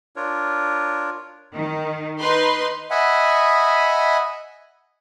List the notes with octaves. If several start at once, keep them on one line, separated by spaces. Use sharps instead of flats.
D4 F4 A#4 C#5
D#3
D#4 B4 C6
D#5 E5 F#5 G#5 B5